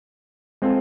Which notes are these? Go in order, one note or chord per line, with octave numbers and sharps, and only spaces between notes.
G#3 C4 F4 A4